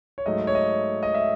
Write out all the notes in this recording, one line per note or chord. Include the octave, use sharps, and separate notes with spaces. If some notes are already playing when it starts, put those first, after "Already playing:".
C#5
G#2 F#3 A3 D#5
C#5
D#5
D#5
E5